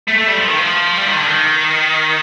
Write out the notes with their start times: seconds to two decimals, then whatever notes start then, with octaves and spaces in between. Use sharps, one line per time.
0.08 A3
0.18 A3
0.27 G3
0.38 F3
0.47 D#3
0.58 F3
0.97 G3
1.07 D#3
1.18 D3
1.28 D#3